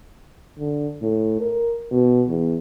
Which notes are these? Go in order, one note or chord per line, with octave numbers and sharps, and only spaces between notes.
D3
A2
A#4
B2
E2